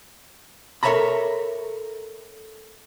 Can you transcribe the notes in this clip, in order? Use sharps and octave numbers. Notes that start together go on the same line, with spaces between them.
A4 A#4 C#5 E5 A#5 B5